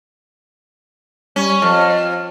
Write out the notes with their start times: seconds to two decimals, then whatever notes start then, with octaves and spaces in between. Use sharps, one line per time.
1.36 G3 C#4
1.62 F2 F6